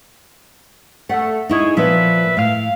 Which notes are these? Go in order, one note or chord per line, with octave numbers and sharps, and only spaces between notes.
A3 F#5
G#3 D#4 E4 G#4 C#5
A#2 F3 B3 B4 E5
A2 F5